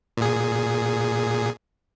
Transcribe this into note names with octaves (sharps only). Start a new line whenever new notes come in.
A#2 G#4